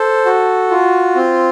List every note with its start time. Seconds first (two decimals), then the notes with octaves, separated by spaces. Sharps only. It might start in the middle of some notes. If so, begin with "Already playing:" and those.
Already playing: A4 C5
0.26 F#4
0.70 F4
1.16 C4